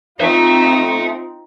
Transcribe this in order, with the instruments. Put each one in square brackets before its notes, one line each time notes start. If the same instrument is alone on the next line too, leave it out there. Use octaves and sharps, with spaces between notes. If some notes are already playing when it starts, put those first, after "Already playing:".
[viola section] C4 F4 [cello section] D#4 [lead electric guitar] E5 A5